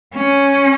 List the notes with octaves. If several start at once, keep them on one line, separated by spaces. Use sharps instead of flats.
C#4